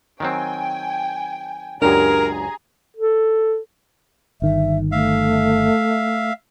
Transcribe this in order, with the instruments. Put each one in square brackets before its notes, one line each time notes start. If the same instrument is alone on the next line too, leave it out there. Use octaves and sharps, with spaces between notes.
[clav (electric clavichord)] D#3 F#3 C4 [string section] G5 G#5
[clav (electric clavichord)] C#2 F#2 [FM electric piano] D4 G4 [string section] G#4 G#5 A#5 [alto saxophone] A#4
[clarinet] A4
[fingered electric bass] G1 D#3 [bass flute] E5
[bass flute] A3 [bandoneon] E5 F5